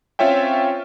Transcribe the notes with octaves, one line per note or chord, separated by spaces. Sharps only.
C4 C#4 F4 C#5 E5 G5